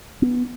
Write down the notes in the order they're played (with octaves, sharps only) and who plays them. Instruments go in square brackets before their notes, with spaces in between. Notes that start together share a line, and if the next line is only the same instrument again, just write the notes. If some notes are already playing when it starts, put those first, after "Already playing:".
[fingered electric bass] B3